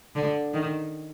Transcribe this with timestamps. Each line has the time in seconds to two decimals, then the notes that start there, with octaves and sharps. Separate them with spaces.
0.15 D3
0.54 D#3